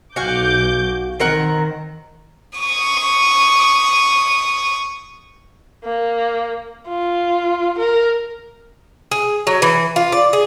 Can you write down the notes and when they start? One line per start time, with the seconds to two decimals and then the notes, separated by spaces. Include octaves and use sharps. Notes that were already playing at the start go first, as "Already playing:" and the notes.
0.16 B1 F#4 F5 G#5 D6 G6
1.20 D#3 C4 A#4 F#5
2.59 C#6 D#6
5.84 A#3
6.88 F4
7.78 A#4
9.11 G#4
9.47 F#3
9.62 E3
9.96 F4
10.12 D5
10.33 G#4